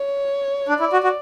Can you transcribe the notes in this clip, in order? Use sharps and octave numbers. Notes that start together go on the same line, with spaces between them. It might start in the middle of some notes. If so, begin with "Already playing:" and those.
Already playing: C#5
D4 D5
E4
F#4
F#4